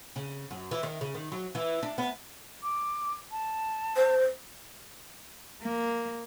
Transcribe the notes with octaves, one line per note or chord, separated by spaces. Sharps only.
C#3
F#2
E3
D#3
C#3
D#3
F#3
E3
D4
B3
D6
A5
C5
A#3